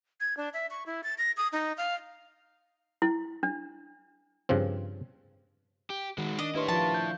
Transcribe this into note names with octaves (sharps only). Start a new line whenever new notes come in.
G#6
D4
E5
C#6
E4
A6
A#6
D#6
D#4
F5
E4
D4
G2 C#3 F3 C4
G4
D#3 G#3 F#4
D4 D#5
D4 E4 G4 B4 C#5 C6
F3 F4 A5
G6